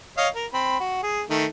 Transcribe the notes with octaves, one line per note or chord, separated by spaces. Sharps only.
C#5 D#5 F5
A#4
C4 B5
F#4
G#4
D#3 A3